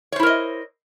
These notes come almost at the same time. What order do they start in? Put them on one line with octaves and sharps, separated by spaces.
C#5 C5 E4 A#4 D#5